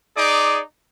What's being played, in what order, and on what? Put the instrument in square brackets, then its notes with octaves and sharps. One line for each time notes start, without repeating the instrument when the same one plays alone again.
[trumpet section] D#4 G#4 D5 D6